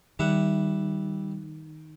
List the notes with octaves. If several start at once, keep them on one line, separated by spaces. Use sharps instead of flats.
D#3 G3 E5 F#5